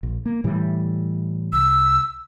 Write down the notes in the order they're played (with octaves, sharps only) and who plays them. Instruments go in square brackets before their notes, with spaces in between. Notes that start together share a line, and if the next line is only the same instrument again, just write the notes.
[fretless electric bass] A#1
A#3
A2 E3 G3
[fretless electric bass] C2 [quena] E6